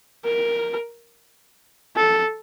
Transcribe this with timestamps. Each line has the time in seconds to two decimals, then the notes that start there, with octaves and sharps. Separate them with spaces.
0.25 A#4
1.96 A4